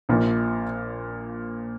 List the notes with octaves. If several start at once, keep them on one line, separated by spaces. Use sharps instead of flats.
A#1 A#2 F3 A#3